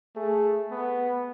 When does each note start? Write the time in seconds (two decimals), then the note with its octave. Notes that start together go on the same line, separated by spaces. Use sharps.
0.16 A3 G#4
0.71 B3